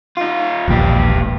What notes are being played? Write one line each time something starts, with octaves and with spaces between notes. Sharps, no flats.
D#4 F4
E1 A#1 D#2 G#2 G4